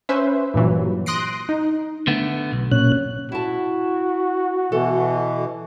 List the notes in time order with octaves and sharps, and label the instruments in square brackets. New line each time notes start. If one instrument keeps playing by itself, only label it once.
[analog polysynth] C#4 B4 C5 E5
G2 A#2 E3 F#3
C6 D#6 F#6 A#6 C7 D7
D#4
[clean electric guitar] D3 A3 B3
B1
[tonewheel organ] A#2 C#4 F#6
[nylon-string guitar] E4 A5 [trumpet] F#4
[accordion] B2 E3 [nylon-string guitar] A4